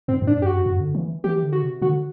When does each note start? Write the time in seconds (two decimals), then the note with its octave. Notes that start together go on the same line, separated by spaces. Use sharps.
0.08 G2 C4
0.22 A2
0.27 D4
0.37 F#2 G4
0.46 G2 F#4
0.51 F#2
0.66 F#2
0.80 D3
0.95 E3
1.24 E3 G4
1.43 D3
1.52 F#4
1.63 C3
1.82 D3 F#4